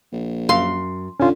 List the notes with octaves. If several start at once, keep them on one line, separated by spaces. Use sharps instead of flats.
A#1
F#2 F5 C6
D3 C#4 F4